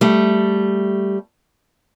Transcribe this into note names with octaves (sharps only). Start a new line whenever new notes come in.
G3 A3